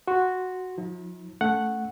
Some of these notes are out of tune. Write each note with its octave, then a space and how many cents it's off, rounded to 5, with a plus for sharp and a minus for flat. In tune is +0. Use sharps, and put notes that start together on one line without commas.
F#4 -5 C6 +0
F3 +45 E4 -40
A3 +0 C#4 +5 F#5 +0